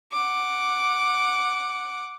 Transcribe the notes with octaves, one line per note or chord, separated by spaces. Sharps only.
F#5 D6